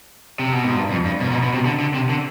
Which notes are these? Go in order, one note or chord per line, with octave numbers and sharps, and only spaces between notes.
C3
B2
G#2
G2
F2
G2
B2
G#2
B2
B2
C3
D3
D3
C3
D3